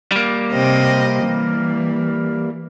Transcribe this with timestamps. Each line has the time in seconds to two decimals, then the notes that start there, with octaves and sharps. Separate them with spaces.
0.12 G3 A#3
0.52 C3 C4 D#5
1.27 E3